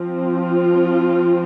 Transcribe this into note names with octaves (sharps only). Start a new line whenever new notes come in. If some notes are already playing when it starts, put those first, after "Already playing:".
Already playing: F3 C4
F4